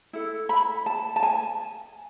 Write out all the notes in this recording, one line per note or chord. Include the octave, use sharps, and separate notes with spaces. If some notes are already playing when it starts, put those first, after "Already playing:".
E4 A4
B5
A5
A5
G#5